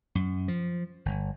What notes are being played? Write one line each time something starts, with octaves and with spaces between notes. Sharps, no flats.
F#2
F3
G1